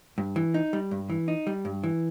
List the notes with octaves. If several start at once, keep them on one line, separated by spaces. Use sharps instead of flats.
G2
E3
D#4
G3
G2
E3
D#4
G3
G2
E3